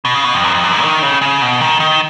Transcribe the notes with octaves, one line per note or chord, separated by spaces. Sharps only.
B2
C#3
B2
F2
F#2
F2
F#2
G#2
D#3
C#3
C#3
B2
D#3
D#3